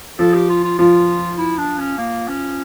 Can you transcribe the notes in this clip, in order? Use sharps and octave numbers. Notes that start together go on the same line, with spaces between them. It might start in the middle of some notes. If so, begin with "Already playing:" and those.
F3 A4
G4
F4
F4
F3 F4
E4
D4
C#4
A#3
C#4